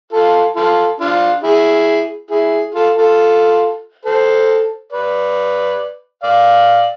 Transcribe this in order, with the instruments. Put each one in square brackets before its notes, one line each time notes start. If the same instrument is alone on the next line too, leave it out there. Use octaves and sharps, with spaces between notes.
[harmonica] F4 A4
F4 A4
D4 F4
E4 G#4
E4 G#4
F4 A4
F4 A4
A4 C5
B4 D5
D5 F5